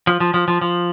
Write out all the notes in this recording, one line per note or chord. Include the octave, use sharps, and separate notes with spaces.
F3
F3
F3
F3
F3